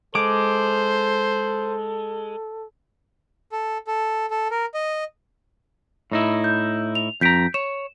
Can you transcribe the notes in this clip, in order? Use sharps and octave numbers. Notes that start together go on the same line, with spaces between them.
G#3 A4 C5 D6
A4
A4
A4
A#4
D#5
A2 D#4 E4
G6
F7
F2 A#5 G6 B6 D7
C#5 E7